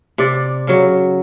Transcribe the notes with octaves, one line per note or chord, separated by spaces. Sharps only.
C3 D5
C#3 F#3